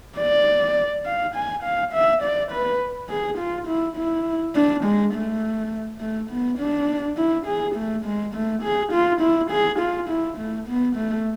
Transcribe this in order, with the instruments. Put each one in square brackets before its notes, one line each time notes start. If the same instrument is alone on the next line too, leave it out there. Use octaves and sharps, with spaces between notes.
[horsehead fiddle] D5
F5
G#5
F5
E5
D5
B4
G#4
F4
E4
E4
D4
G#3
A3
A3
B3
D4
E4
G#4
A3
G#3
A3
G#4
F4
E4
G#4
F4
E4
A3
B3
A3